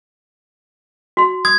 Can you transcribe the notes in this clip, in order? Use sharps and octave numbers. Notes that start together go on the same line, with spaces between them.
F#4 C6
D#6 G#6